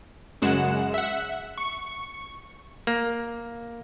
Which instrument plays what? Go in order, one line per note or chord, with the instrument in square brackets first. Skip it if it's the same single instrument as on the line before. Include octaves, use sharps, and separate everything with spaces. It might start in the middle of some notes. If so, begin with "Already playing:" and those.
[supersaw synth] F#2 C#3 G#3 F#5 E7
E5 F#5
C#6
[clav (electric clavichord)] A#3